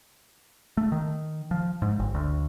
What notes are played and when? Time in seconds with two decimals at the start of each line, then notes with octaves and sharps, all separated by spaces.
0.77 A3
0.92 D#3
1.51 F3
1.82 G#2
1.99 G1
2.15 D2